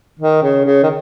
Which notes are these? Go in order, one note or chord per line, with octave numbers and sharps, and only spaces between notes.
D#3
C#3
C#3
D#3